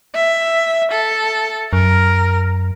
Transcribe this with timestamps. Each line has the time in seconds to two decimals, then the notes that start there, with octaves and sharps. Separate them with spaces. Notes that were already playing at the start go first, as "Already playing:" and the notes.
0.15 E5
0.92 A4
1.73 F#2 A#4